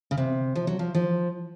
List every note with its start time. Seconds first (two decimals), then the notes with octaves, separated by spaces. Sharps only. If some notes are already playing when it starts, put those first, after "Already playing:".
0.11 C#3
0.17 C3
0.56 F3
0.67 F#3
0.79 F3
0.95 F3